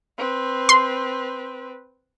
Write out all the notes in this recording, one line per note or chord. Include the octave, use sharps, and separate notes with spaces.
C4 B4
C6